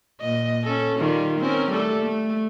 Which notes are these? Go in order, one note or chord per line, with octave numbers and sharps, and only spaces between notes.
A#2 D#5
C#4 A4
D#3 G3 F4
C4 C#4 A#4
G3 A3 A4
A3